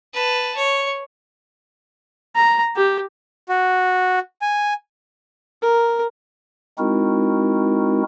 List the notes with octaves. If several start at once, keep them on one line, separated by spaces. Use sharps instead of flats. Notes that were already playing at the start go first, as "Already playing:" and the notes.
B4 A5
C#5
A#5
G4
F#4
G#5
A#4
G#3 C4 D#4 E4 F#4 A#4